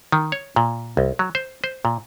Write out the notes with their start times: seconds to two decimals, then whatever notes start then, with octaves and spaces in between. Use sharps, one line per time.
0.12 D#3
0.32 C#5
0.56 A#2
0.97 C2
1.19 F#3
1.35 C5
1.64 C5
1.85 A#2